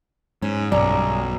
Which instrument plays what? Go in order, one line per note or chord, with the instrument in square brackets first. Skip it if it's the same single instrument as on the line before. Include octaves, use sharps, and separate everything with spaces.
[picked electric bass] G#2 [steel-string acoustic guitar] C#4
[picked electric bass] B1 [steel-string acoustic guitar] G2 C#4 [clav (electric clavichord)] D5 [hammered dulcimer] A#5